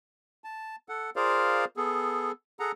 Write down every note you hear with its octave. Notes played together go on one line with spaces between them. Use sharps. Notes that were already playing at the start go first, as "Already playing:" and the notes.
A5
A4 F#5
F4 G#4 A#4 C5 D5 F5
B3 G#4 A4
G#4 A4 F#5 A#5